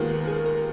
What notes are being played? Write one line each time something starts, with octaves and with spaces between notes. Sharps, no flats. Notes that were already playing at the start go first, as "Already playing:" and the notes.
Already playing: D#2 D#3 G#3 B3 F4 A#4
G#4
A#4